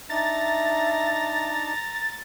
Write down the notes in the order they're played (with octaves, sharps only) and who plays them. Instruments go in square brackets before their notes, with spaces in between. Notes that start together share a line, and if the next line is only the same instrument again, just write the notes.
[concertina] D4 D#4 [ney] E5 [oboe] A#5 [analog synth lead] A6